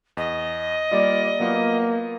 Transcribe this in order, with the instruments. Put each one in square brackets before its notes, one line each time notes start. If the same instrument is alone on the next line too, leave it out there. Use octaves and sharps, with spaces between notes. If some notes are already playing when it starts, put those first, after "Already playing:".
[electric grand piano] E2 [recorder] D#5
[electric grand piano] G3 A#3 F4 [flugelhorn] D5
[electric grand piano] F#3 B3 F4 [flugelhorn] A#3